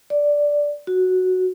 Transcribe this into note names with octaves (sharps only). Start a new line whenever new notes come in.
D5
F#4